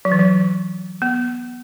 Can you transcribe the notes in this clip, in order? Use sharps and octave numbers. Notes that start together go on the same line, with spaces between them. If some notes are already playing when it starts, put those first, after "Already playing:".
F#3
E3
F#3
B3